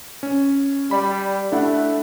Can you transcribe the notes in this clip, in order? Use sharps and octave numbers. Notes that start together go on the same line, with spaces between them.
C#4
G3 D5 B5
A3 D4 E4 F#5